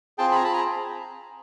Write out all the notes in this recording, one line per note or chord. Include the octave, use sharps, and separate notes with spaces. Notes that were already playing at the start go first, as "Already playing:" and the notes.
C4 F4 G#4 G5 A5
B5
G#5 A#5
A5 B5
G#5 A#5